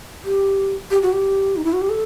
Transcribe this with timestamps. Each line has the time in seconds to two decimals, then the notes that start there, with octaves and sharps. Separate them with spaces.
0.25 G4
0.91 G4
1.03 F#4
1.13 G4
1.56 D#4
1.64 E4
1.73 F#4
1.81 G4
1.90 A4